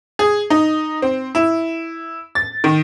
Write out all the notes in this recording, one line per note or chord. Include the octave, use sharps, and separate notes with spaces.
G#4
D#4
C4
E4
A6
D#3